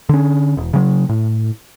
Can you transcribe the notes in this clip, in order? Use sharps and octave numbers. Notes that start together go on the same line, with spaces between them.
D3 C#4
E1
C#3 F#3
A2